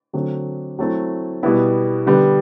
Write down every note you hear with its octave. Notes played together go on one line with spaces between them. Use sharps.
D3 F#3 A3 C4
F#3 A3 C4 E4
B2 G3 B3 E4
D3 G3 B3